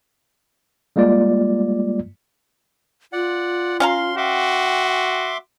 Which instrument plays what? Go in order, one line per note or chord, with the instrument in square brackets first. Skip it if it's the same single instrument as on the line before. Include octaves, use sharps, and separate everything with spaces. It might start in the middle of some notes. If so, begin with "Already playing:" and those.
[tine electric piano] G3 G#3 A#3 F4 D5
[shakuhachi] F4 [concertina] D5 F#5
[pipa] C#4 F5 A#5 [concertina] C6
[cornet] F#4 [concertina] E5 C6 D6 [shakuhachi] G5